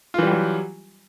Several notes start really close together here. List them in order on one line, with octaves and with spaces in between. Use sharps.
F4 E3 G3 G4 F#3